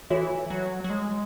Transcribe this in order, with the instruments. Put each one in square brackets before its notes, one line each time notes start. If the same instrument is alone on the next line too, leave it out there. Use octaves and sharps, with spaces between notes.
[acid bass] E3 [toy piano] F#4 A4 C#5 E5
[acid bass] F#3
F#3
G#3